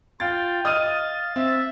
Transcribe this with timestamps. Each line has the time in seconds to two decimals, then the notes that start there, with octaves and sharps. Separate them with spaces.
0.20 F4 F5 G5 A6
0.65 D#5 F5 D#6 F6 A6 D#7
1.36 C4 E5